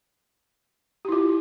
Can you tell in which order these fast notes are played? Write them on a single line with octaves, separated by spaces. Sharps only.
G4 E4 F4